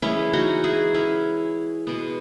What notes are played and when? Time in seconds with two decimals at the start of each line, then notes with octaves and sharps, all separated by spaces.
0.02 E3 G#3 B3 C#4 E4
0.33 D#4 F#4
0.64 E4 G#4
0.94 C#4 E4
1.87 B2 G#3 B3